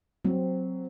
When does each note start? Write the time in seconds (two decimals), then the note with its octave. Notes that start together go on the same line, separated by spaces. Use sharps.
0.25 F#3 C4